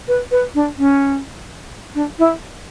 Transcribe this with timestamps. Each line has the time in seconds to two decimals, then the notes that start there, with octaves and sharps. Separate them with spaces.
0.08 B4
0.31 B4
0.55 D4
0.78 C#4
1.95 D4
2.19 E4